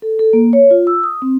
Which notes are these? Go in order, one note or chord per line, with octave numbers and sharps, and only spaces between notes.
A4
A4
A#3
C#5
F4
E6
D#6
C4